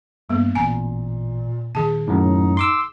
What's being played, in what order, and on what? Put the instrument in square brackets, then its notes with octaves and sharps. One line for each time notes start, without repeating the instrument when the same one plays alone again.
[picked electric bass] G2 [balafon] A#3 B3
[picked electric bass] A1 [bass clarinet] A#2 [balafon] G#5 A#5
[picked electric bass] A#2 D#3 [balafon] G#4 A5
[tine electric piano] F#2 A2 [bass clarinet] D#4
[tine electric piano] C6 D6 E6